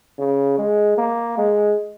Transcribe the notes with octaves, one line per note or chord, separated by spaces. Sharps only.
C#3
G#3
A#3
G#3